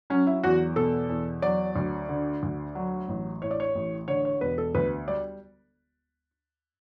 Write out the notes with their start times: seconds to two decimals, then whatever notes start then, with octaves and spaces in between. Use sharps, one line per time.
0.10 F#3 C#4
0.27 E4
0.43 E2 F#4
0.76 B2 A4
1.09 E2
1.42 F#3 D5
1.76 D2
2.09 D3
2.43 D2
2.75 F#3
3.08 A1
3.42 A2 C#5
3.51 D5
3.60 C#5
3.75 A1
4.08 D3 C#5
4.25 C#5
4.41 E1 B4
4.58 A4
4.75 D2 B4
5.08 G3 D5